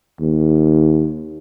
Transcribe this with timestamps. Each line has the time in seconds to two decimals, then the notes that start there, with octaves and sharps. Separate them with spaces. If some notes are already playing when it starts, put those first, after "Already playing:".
0.21 D#2